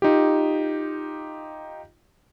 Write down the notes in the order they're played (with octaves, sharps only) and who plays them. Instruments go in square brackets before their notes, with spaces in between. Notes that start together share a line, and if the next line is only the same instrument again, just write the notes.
[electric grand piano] D#4 F4 G4